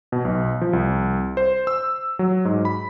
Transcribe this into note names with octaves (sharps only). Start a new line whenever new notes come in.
B2
B1
F3
C2
C5
E6
F#3
G#2
B5